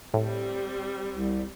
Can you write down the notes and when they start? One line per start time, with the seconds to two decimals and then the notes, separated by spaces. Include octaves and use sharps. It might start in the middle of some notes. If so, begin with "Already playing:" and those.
0.14 A2 G3 C4
1.11 C2